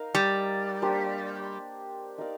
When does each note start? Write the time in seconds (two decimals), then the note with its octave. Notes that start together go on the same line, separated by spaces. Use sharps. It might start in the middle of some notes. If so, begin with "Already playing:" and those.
Already playing: D#4 A#4 F5
0.15 G3
0.82 A#3 D4 G4 C5
2.18 D#4 A#4 D5 F5